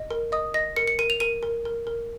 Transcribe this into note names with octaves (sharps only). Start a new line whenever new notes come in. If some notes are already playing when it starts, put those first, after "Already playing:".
Already playing: D#5
A#4
D#5 D#6
D#5 A#6
A#4 C#7
C#7
A#4 D#7
F7
A#4 D#7
A#4
A#4
A#4